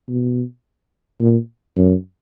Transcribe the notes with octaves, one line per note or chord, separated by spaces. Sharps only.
B2
A#2
F#2